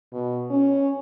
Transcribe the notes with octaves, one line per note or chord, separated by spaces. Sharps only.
B2
C#4